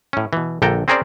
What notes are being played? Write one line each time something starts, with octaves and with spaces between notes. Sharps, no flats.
A2 C#4
B2 E3
A#1 D3 A4 G5 A#5
C4 C#4 G#4 A#4 C5 D5